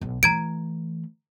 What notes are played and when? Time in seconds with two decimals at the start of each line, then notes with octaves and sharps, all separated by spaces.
0.01 B1
0.23 E3 A3 A#5 G#6 D7